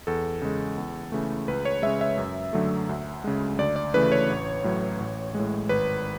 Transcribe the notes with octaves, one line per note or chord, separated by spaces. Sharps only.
E2 A4
C#3 G#3
E2
C#3 E3 A3
C#2 B4
C#5
C#3 G#3 E5
E5
F#2
D3 F#3 A3
D2
C#3 G#3
D2 D5
D5
C#3 E3 A3 B4
C#5
A1
A2 F#3
A1
A2 G#3
G#1 B4